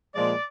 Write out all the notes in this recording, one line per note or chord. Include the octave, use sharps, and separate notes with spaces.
A#2 F3 G#3 D5